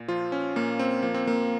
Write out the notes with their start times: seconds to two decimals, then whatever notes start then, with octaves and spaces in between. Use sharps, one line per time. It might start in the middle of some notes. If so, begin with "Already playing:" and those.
Already playing: A#2
0.08 F3 F4
0.32 C#4
0.56 A#2 A#3
0.79 C4
1.03 F3 A#3
1.14 C4
1.27 A#3